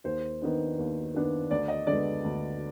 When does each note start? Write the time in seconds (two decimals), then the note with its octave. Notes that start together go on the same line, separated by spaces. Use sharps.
0.04 D#2 C5
0.42 D#3 B3 D4
0.78 D#2
1.14 D#3 B3 D4
1.51 D2 D5
1.68 D#5
1.87 D3 G#3 B3 D5
2.24 D2